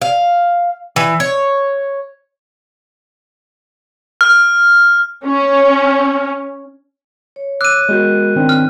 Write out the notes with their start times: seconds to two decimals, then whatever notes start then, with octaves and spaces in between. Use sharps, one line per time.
0.02 F5
0.96 E3
1.20 C#5
4.21 F6
5.25 C#4
7.36 C#5
7.61 D6 E6 F#6 D#7
7.89 G#3 B3 F#4 A#4 G6
8.36 D#3 C4 D4
8.49 F6